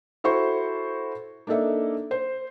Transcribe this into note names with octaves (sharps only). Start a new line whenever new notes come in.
E4 F#4 A4 C5 C#6
A#3 D4 D#4 A4 E5
C5